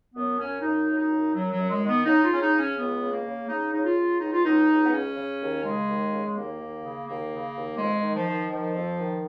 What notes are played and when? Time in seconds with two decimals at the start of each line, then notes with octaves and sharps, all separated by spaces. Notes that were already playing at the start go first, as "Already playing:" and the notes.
0.15 F#2 B3
0.38 F#2 C#4
0.61 F#2 D#4
0.86 F#2
0.98 D#4
1.10 F#2
1.33 F#2 F#3
1.51 F#3
1.57 F#2
1.70 G#3
1.81 D#3
1.88 B3
2.05 C#3 D#4
2.23 F4
2.29 C#3 C#4
2.41 D#4
2.52 C#3
2.58 C#4
2.76 C#2 B3
3.01 C#3
3.12 A#3
3.25 C#3
3.48 C#3 D#4
3.72 C#3 D#4
3.84 F4
3.96 C#3
4.20 C#2 D#4
4.33 F4
4.44 C#2 D#4
4.68 C#2
4.83 B3
4.91 C#3 C#4
5.15 C#3
5.39 D#2
5.63 C#3 G#3
5.87 D#2
6.11 C#3
6.25 G#3
6.34 D#2 A#3
6.58 D#2
6.82 C#3
7.06 D#2 A#3
7.30 C#3
7.55 D#2
7.77 F2 G#3
8.02 D#3
8.14 F3
8.25 D#3
8.49 D#3 F3
8.73 F2
8.97 D#3